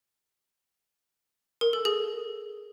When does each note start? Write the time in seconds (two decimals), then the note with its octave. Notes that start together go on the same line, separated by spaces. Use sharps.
1.61 A#4
1.73 A4
1.85 G#4